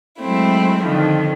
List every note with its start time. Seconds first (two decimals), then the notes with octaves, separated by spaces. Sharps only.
0.20 F#3 G#3 A3 C4 E4
0.82 F2 D3 D#3 F3